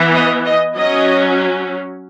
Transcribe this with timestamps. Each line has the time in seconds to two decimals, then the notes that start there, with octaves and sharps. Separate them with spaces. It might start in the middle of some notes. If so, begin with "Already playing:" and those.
Already playing: E3 B3
0.15 D#5
0.44 D#5
0.75 F#3 C#4 D#5